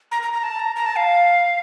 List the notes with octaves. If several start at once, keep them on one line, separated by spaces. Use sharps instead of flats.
A#5
A#5
A#5
A5
A#5
A#5
A5
F5